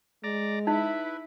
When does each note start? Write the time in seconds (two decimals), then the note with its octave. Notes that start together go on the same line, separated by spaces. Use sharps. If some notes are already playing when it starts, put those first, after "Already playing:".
0.24 G#3 D5 A#5
0.67 D#4 E4 B4